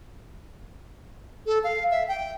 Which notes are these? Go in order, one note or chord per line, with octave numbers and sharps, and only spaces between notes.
A4
F5
E5
G5